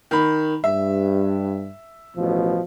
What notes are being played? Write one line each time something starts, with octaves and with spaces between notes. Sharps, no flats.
D#3 B5
G2 E5
A1 B2 F3